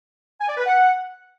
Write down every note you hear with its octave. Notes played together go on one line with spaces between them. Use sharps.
G#5
D5
B4
F#5